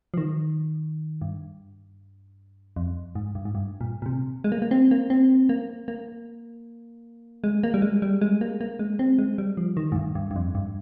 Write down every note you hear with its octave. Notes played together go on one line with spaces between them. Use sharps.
F3
D#3
G2
F2
G#2
G2
G#2
G2
A#2
A#2
C3
G#3
A#3
A#3
C4
A#3
C4
A#3
A#3
G#3
A#3
G3
G#3
G3
G#3
A#3
A#3
G#3
C4
G#3
G3
F3
D#3
G#2
G2
G2
G2
F2
G2